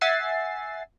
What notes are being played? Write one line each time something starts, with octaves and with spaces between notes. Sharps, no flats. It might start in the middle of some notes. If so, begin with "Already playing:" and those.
E5 F#5 G#5 A6 C7